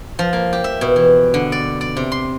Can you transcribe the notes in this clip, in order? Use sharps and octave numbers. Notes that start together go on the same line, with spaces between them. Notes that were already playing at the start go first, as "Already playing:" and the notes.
F3
A#3
G4
E5
B2
E3
D3
D5
D5
C3
C6